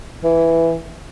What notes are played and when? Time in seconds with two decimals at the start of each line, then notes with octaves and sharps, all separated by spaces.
0.24 E3